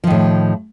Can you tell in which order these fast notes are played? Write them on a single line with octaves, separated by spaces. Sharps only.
F3 D#3 A2